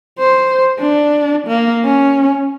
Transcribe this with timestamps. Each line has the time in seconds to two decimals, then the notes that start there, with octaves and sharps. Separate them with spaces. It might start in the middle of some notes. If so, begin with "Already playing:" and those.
0.19 C5
0.79 D4
1.48 A#3
1.85 C#4